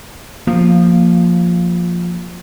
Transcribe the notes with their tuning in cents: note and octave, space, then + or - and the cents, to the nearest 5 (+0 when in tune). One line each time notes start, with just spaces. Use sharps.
F3 +5 A#3 -10